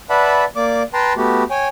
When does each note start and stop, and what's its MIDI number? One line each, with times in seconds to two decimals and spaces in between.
0.10 0.45 71
0.10 0.45 74
0.10 0.45 76
0.10 0.45 78
0.10 0.45 81
0.10 0.45 83
0.56 0.83 58
0.56 0.83 74
0.56 0.83 86
0.94 1.13 71
0.94 1.13 79
0.94 1.13 81
0.94 1.13 82
0.94 1.13 84
1.17 1.44 57
1.17 1.44 59
1.17 1.44 66
1.17 1.44 67
1.50 1.68 73
1.50 1.68 79
1.50 1.68 80